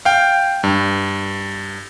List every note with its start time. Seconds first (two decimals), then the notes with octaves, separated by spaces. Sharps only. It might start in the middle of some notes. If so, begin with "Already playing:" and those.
0.05 F5 G5
0.64 G2